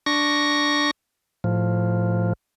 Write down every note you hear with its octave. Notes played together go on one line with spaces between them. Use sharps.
D4 C#6 A#6
A2 F3